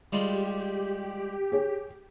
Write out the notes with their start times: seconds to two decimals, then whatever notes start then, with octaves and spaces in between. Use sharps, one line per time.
0.12 G3 G#3 F4 G4
1.52 G#4 C#5